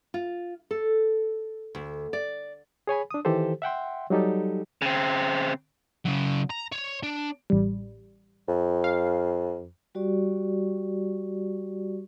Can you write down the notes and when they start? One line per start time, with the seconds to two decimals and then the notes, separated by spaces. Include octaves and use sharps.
0.14 F4
0.71 A4
1.75 D2
2.13 D5
2.87 G#4 C#5 G#5 B5
3.11 D4 D#6
3.25 D#3 E3 G4 A4 C5
3.62 E5 F#5 G5 C6
4.10 F#3 G3 D#4 G4 A4
4.82 C#3 C4
6.06 C#3 F#3
6.50 A#5
6.72 C#5
7.03 D4
7.50 A1 G3
8.48 F2
8.84 F5
9.95 G3 F#4 G4 D5 C#6